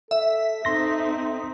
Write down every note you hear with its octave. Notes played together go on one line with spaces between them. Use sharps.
A4 E5
C4 D#4 A4 C6 A#6